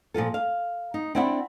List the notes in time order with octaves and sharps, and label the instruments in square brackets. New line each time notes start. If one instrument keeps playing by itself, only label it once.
[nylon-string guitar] A#2 F3 F4 A4
F5
D#4
C4 D4 E4 D5 F#5